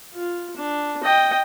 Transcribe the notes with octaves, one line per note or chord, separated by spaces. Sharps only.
F4
D4
D#5 G5